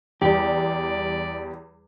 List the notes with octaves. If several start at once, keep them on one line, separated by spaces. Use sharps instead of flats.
E2 G3 G4 D5